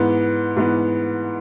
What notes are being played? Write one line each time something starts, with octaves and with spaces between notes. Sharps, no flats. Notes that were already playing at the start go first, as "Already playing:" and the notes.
Already playing: G#2 E3 B3
G#2 E3 B3